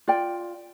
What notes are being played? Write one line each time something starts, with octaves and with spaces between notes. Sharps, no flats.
F4 D5 G5